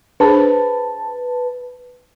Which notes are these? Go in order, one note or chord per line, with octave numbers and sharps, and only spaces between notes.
D4 G#4 B4 C5 A5